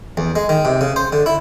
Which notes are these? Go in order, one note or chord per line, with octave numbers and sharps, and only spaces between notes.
E2
G#3
D#3
C3
C#3
C5
D3
E4